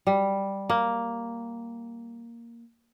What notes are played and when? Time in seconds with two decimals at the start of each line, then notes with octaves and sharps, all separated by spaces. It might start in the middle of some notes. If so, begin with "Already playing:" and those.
0.07 G3
0.70 A#3